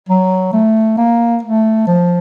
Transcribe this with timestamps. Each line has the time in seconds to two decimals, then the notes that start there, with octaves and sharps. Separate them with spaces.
0.09 F#3
0.53 A3
0.98 A#3
1.43 A3
1.87 F3